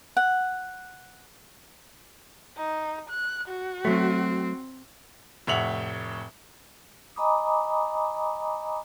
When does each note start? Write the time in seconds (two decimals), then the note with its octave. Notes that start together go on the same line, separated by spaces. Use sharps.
0.17 F#5
2.58 D#4
3.10 F#6
3.49 F#4
3.85 F#3 A3 C4
5.47 F1 A2 E5 F#5 F7 F#7
7.16 D#5 G#5 A#5 B5 D6 D#6